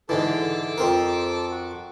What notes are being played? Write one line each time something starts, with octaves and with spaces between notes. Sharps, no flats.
G#2 D3 E3 A4 A5 D6
F2 C4 A#4
F#4